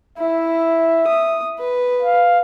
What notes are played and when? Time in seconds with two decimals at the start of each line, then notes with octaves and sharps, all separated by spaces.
0.18 E4 E5
1.07 D#6
1.59 B4
2.02 F5